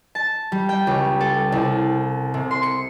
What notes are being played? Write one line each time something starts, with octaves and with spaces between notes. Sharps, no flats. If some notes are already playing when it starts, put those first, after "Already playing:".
A5
G3
G5
C#2
A4
C2
C3
C6
C#7